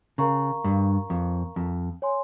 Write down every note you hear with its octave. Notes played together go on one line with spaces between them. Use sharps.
C#3 A#4 F5 A#5 C#6
G2
F2
F2
C#5 G#5 C6